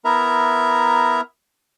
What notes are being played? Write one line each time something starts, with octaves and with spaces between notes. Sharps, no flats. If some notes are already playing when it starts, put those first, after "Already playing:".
B3 E4 A#4 E5 A#5